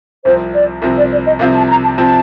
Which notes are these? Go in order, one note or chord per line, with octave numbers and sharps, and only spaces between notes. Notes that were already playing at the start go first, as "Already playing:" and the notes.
C2 C3 F3 C4 C5
D5
C2 C3 F3 C4
D5
D5
D#5
C2 C3 F3 C4 F5
A5
A#5
A5
C3 F3 C4 A5